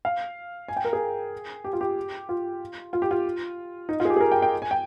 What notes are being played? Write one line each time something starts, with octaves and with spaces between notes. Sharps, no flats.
F5
G#5
G5
A#4
G#4
G4
F4
G4
F4
F4
G4
F4
D#4
F4
G#4
G4
G#4
A#4
G5
G5
G#5
G5